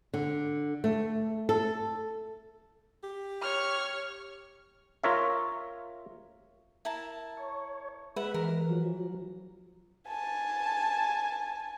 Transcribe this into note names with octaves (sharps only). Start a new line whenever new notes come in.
D3
A3
A4
G4
C#5 F6
F4 A#4 C#5 E5
E4 A#4 A5
C#5
G#3 B4 E5 F#5
E3 A#4
F3 F#3
G#5 A5